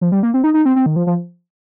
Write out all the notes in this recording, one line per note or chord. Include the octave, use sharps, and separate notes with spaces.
F3
G3
A#3
C4
D#4
D#4
C4
C4
D#3
F3
F3